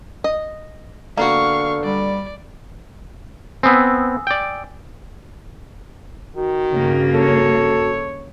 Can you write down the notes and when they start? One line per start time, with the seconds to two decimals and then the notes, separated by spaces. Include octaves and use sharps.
0.24 D#5
1.17 D3 A#3 B3 F#4 F5 C#6
1.84 G3 D5
3.63 B3 C4 G#5 D#6 E6
4.27 D5 G5
6.35 D#3 F#4
6.72 G2 C#3 A#3
7.14 A4 C#5